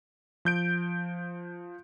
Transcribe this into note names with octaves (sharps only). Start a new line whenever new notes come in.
F3 G6 D7